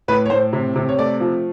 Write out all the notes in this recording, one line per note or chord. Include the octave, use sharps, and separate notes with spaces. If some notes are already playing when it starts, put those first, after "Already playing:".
A2 B4
C#5
A2 C5
C3
C3
C#5
A3 D5
F3